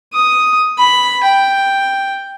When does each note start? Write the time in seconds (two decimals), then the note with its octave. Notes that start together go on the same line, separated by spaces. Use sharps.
0.14 D#6
0.78 B5
1.24 G5